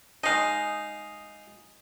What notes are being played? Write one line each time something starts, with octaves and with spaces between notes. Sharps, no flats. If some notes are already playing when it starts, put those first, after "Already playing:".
G#3 D#4 D#5 F5